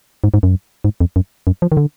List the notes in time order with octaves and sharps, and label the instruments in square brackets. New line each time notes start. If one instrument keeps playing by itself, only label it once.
[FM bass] G#2
G#2
F#2
G#2
F2
F#2
F#2
F3
D#3
D3